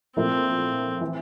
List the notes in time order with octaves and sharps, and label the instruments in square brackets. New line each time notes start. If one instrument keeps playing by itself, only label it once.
[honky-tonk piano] A#2 F3 A3 E4 A#4 [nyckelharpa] C4
[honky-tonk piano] E3